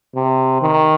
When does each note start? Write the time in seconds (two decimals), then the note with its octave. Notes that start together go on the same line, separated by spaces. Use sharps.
0.16 C3
0.62 D#3